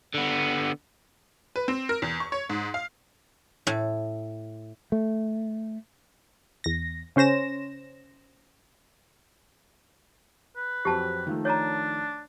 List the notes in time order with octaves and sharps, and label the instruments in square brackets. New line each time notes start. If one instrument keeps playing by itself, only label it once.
[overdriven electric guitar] D3 B3
[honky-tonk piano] B4
C4
A#4
E2
C#6
C#5
G#2
F5
[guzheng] A2
[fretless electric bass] A3
[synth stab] E2 A#6
C#3 C#4 C5 A#6 E7
[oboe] B4
[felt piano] F2 F#3 C4 [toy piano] G4 A5
[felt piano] D#3 F3 A3
[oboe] D4 [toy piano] C#5 A5 A#5